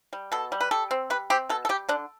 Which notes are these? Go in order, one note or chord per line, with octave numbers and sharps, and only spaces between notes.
G3
B2 A4
G3
B4
G3 A4
C4
G3 B4
C4 G4
B2 A4
A4
G3 G4
D3 D4